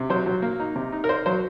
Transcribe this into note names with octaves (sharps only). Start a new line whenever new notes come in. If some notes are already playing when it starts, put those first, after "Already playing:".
Already playing: C3
F#3 C5
F#3
A#3
D#4
C3
D#4
A#4
D#4 C5
F#3 C5